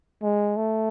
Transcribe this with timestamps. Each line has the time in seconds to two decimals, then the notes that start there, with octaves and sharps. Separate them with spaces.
0.23 G#3
0.57 A3